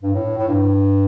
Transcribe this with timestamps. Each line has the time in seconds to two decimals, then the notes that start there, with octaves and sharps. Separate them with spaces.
0.03 G2
0.13 A2
0.38 A2
0.48 G2